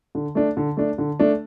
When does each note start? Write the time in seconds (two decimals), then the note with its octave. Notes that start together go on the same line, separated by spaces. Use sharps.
0.15 D3
0.35 A3 D4
0.57 D3
0.77 A3 D4
0.98 D3
1.19 A3 D4